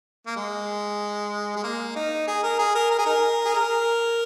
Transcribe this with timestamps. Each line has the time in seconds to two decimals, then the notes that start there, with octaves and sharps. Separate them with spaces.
0.26 A#3
0.36 G#3
1.56 G#3
1.64 A#3
1.95 D#4
2.28 G#4
2.43 A#4
2.59 G#4
2.75 A#4
2.91 A#4
2.98 G#4
3.06 D#4 A#4
3.45 G#4
3.54 A#4